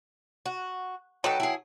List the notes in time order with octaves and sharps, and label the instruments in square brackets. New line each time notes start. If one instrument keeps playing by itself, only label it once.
[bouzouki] F#4
[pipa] F#3 [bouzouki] D#4 A4 B4 [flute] G5
[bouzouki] E4 G#4